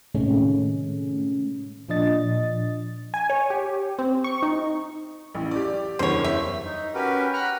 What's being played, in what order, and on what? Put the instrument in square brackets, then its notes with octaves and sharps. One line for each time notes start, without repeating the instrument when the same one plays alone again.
[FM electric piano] A2 C3 D#3 G#3 A3 C#4
A#2 F3 D4 D#5 A6
[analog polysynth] G#5
C#5
G4
C4
C#6
D#4
[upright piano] A1
G4 D5
[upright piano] F#1 E2 G2 [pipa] C5 C#5
[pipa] E5
[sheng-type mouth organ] D#4
C#4 F#4 G4 A#4 B4
F#5 A#5 B5 F6 F#6